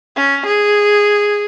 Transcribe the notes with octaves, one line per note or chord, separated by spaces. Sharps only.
C#4
G#4